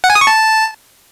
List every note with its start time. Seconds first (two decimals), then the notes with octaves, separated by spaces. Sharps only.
0.04 F#5
0.10 G#5
0.15 D#6
0.21 C#6
0.27 A5